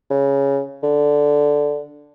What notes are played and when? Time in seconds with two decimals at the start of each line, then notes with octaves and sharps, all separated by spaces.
0.10 C#3
0.83 D3